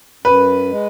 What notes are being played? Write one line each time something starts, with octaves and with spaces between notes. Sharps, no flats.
F#2 B4
G#3